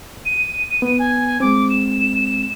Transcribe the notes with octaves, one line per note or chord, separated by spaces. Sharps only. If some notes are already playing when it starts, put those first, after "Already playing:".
D#7
B3
G#5
G#3 C4 D6
E7